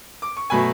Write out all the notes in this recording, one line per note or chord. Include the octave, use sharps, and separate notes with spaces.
D6
C#6
B2 F#3 A3 G#5 B5